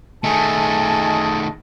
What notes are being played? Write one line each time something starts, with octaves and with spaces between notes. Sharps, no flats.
D#3 A3 G#4 D#5 G#5 A5